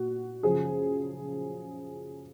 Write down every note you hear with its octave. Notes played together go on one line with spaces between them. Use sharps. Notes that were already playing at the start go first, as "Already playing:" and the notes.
Already playing: A#2 F#4
F#2 C#3 F3 G#4